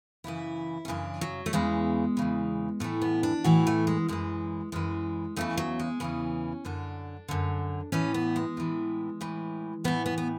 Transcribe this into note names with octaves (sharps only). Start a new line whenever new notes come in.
F#2 C#3 E3 E4
C#4
F#2 C#3 E3 D4
F#3
A3
E2 C#3 E3 G#3
E2 C#3 E3
A2 E3 A3
B3
D4
A2 E3 F#4
A3
G#3
F#2 E3 G#3
F#2 E3 G#3
E2 C#3 E3 A3
F#3
G#3
E2 C#3 E3 C#4
F#2 D3 D4
F#2 D3
A2 E3 C#4
B3
G#3
A2 E3
A2 E3
A2 E3 B3
B3
B3